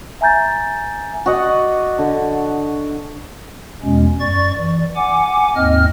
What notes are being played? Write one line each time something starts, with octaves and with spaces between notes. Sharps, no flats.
E5 G#5 A#5 G6 A6
F#4 D5 D#5 F#5
D3
E2 B2 G#3 C#4
F#2 D5 C#6 A6
E3 D5
F#5 G#5 D6
D#2 G#2 C4 D#5 F6